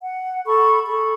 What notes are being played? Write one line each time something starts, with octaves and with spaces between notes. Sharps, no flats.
F#5
A4 B5 C#6
G#4 A4 B5 C#6